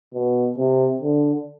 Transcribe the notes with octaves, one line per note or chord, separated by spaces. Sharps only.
B2
C3
D3